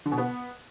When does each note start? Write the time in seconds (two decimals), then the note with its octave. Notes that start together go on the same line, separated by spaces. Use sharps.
0.06 D3
0.12 B2
0.18 B3